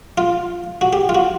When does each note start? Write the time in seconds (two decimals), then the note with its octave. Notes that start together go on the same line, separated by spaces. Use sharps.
0.18 F4
0.81 F#4
0.93 G4
1.09 F4
1.15 F#4